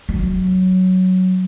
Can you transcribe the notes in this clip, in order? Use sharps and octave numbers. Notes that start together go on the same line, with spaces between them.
F#3